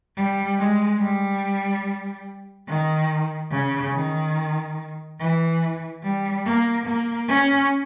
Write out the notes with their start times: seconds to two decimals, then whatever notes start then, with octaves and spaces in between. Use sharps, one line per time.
0.16 G3
0.58 G#3
1.00 G3
2.67 D#3
3.50 C#3
3.92 D#3
5.19 E3
6.03 G3
6.45 A#3
6.86 A#3
7.28 C#4